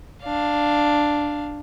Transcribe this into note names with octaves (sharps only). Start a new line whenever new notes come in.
D4 F5